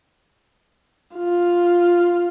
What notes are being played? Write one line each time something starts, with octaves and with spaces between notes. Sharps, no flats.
F4